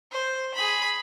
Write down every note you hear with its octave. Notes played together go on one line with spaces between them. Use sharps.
C5
G#4 B5